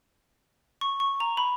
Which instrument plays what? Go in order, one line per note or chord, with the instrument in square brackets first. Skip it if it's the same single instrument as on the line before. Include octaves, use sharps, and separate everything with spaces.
[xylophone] C#6
C#6
A#5
B5